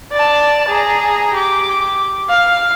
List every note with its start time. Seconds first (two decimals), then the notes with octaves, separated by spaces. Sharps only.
0.12 D5 A5
0.68 G#4 A#5
1.34 G4 D6
2.29 F5